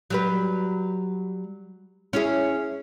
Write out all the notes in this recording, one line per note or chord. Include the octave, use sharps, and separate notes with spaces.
F#3 G3 B4
C#4 E4 G#4